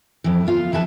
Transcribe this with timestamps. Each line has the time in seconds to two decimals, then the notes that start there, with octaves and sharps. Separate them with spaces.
0.24 F2 E3
0.46 D2 B3 F4 F5
0.72 F2 E3 E4 A4 B4 A5